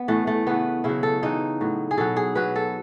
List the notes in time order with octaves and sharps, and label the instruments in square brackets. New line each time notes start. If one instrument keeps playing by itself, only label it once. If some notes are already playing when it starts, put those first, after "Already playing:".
Already playing: [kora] B3
A2 E3 A3
A3
C#3 E3 B3
C#3 F#3 E4
A4
C#3 E3 D#4
A2 F#3
G#4
B2 F#3 A4
G#4
B2 F#3 B4
A4